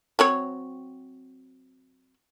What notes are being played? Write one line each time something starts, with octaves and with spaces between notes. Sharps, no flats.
F#3 C4 C#5